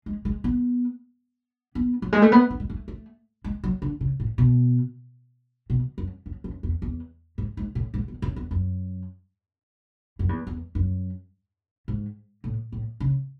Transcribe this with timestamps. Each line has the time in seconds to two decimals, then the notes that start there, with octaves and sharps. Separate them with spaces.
0.06 G#3
0.25 G#3
0.44 B3
1.75 B3
2.02 F#3
2.12 G#3
2.22 A3
2.32 B3
2.50 B3
2.60 G#3
2.70 A3
2.88 A3
3.44 G#3
3.64 F#3
3.82 D3
4.01 C#3
4.20 A2
4.38 B2
5.70 B2
5.98 F#2
6.26 F#2
6.44 F#2
6.63 E2
6.82 E2
7.38 G#2
7.57 G#2
7.75 A2
7.94 G#2
8.08 E2
8.22 F#2
8.36 E2
8.51 F#2
10.19 F#2
10.29 E2
10.47 E2
10.75 F#2
11.88 G#2
12.44 A2
12.72 A2
13.00 C#3